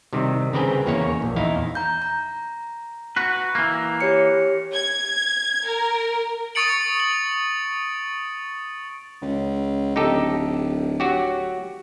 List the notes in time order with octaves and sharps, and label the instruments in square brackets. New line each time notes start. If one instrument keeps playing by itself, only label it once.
[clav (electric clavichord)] C3 D#3 G3
C#3 C4 A#4 B4 G5 G#5
E2 A#3 C#4 A#4 C#5
A#1
E2 D#4 E4 F5
[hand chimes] A#5 G6
A#5
[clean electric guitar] F#4 B4
E3 A#3
[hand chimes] G4 C#5 C#7
[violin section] G#6
A#4
[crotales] C#6 D#6 A6 C#7 D7 F#7
F#7
[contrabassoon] C#2
[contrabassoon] D1 [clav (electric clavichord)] D#4 G4 A4
[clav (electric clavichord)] F#3 F#4 G4